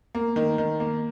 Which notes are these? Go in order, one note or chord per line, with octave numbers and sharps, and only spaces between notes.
A#3
D#3
D#3
A#3